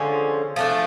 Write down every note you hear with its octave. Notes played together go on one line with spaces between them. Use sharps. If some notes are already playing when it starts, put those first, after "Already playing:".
Already playing: D3 F3 G#3 C#4
F3 A3 D4